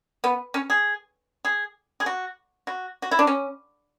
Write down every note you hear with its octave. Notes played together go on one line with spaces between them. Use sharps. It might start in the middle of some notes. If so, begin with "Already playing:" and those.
B3
C#4
G#4
G#4
G#4
F#4
F#4
F#4
E4
D4
C#4